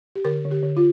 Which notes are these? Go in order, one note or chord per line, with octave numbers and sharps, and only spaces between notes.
G4
D3 A#4
D3
G4
D3
F4